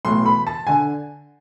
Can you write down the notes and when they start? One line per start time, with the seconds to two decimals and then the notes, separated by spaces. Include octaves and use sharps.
0.05 B1 A2 E3 C6
0.26 B5
0.47 A5
0.67 D3 G#5